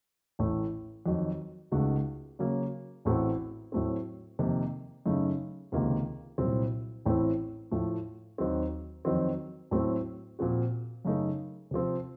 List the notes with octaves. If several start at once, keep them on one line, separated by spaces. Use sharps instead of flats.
A1 A2 A3
F2 D#3 F#3
C#2 C#3 A3 D#4 F#4
C#3 F#3 A#3 C#4
A1 A2 A3 C4 F#4
A2 F#3 A3 C4
F2 C3 D#3 A#3
F#2 C#3 A3 D#4
C#2 C3 D#3 A#3 F4
C2 A#2 F#3 C4
A1 A2 A3 C4
A2 F3 A3
D#2 D#3 F#3 C4
F2 D#3 F#3 C4
A2 F#3 A3 C4
A#2 F3 C4 F#4
F#2 C#3 A3 D#4 A#4
C3 F3 C4